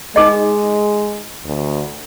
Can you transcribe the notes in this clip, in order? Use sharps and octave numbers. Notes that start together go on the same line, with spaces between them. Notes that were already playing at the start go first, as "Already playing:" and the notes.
G#3 D#4 G#4 D#5
D2